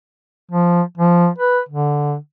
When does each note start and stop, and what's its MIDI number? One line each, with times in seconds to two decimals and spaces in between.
0.51 0.82 53
0.98 1.28 53
1.39 1.60 71
1.69 2.15 50